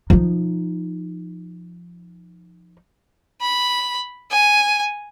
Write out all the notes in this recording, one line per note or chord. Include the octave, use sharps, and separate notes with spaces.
F3 D#4
B5
G#5